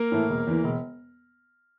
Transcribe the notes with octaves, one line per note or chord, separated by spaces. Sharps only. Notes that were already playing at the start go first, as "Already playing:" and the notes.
Already playing: A#3 A#4
A2 E3 A3
E1
E2 E3
E1